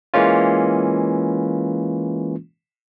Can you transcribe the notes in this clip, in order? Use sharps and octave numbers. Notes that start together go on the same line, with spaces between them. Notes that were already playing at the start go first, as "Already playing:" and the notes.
E3 G#3 A#3 C#4 F4